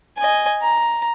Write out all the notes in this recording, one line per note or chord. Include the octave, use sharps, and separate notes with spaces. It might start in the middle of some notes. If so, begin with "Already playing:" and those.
D#5 G#5
A#5